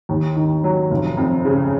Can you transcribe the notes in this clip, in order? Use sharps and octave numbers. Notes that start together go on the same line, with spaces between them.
D#2
D#3
F#3
F1
F2
C#3